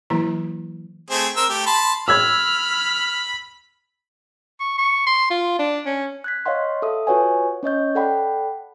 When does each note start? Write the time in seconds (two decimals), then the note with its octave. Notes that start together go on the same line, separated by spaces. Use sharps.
0.10 E3 F#3 A#3 E4 A#5
1.10 A3 C4 G#4
1.37 C4 A#4 E6
1.49 A3 G4
1.66 A5 B5 C6
2.08 B5 E6 F6 G#6
4.60 C#6
4.78 C#6
5.07 C6
5.30 F4
5.59 D4
5.86 C#4
6.24 F#6 G#6 B6
6.46 C#5 D#5 F5 F#5 C6
6.82 A4 E5 D#6
7.07 F4 F#4 B4 C#5 F#5 G#5
7.63 C#4 C#5 D#5 G6
7.95 A4 D5 F#5 G5 B5